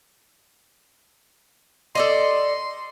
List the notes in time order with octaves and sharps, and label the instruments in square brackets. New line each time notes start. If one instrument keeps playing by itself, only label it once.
[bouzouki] A4 D5 D#5 [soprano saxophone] C6